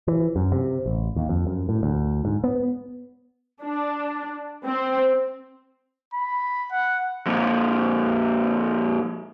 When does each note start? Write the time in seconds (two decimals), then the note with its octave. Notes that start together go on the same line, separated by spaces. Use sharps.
0.08 E3
0.36 F#2
0.52 C3
0.86 A1
1.16 D#2
1.29 F2
1.47 F#2
1.69 A2
1.83 D2
2.25 G#2
2.44 B3
3.63 D4
4.65 C4
6.13 B5
6.71 F#5
7.26 F2 A#2